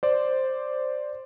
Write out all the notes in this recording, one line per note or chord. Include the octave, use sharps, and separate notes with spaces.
C5 D5